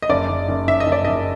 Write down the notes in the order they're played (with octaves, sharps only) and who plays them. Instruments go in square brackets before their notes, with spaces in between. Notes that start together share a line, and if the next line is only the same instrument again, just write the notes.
[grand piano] D#5
F#1 D5
F#1
F#1
F#1 E5
D#5
F#1
D5
F#1 D#5